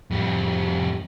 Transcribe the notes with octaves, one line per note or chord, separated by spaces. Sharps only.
F2 G3